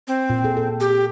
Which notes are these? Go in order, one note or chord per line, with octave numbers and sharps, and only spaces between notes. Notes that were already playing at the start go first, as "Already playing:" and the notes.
C4
A#2
G#4 A4
A4
G4